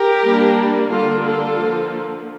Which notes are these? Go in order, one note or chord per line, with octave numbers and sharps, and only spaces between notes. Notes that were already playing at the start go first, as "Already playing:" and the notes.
Already playing: G4 A#4
G3 A#3 D4
D3 G3 A#3 D4 F4 A4
F4 A4
D3 F3 A#3